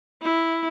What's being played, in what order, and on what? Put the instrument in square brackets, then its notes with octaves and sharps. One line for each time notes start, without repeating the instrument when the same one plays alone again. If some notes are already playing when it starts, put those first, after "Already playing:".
[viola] E4